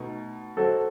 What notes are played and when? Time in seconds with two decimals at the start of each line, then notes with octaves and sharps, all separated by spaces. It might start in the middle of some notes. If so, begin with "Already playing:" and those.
Already playing: B2 A3 D#4
0.57 F#3 C4 F#4 A4 C5 D#5